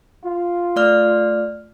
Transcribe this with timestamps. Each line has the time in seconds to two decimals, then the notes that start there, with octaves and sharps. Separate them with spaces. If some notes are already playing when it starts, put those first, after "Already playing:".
0.25 F4
0.76 A3 D5 F6